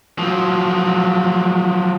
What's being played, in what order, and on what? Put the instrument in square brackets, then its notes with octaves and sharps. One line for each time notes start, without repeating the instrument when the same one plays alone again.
[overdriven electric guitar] F3 F#3